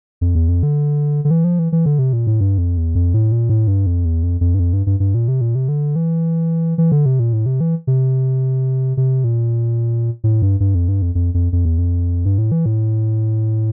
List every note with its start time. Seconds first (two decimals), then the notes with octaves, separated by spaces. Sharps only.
0.21 F2
0.35 E2
0.48 F2
0.63 D3
1.25 D3
1.31 E3
1.44 F3
1.59 E3
1.72 E3
1.86 D3
1.99 C3
2.13 A#2
2.27 A2
2.41 G2
2.58 F2
2.77 E2
2.95 F2
3.14 A2
3.32 A#2
3.49 A2
3.68 G2
3.86 F2
4.05 E2
4.23 F2
4.41 F2
4.54 G2
4.59 F2
4.73 G2
4.86 G2
5.00 G2
5.14 A#2
5.28 C3
5.41 A#2
5.55 C3
5.69 D3
5.96 E3
6.78 E3
6.92 D3
7.06 C3
7.20 A#2
7.33 A2
7.46 C3
7.61 E3
7.87 C3
8.97 C3
9.24 A#2
10.24 A2
10.42 G2
10.60 G2
10.75 F2
10.88 G2
11.02 F2
11.15 F2
11.34 F2
11.53 F2
11.65 E2
11.78 F2
12.25 G2
12.38 A2
12.52 E3
12.66 A2